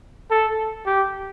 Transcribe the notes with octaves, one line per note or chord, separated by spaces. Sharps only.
A4
G4